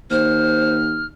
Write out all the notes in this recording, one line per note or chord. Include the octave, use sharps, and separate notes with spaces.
D#2 C5 F6